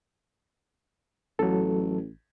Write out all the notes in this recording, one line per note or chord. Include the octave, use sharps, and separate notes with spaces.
A1 F#3 A4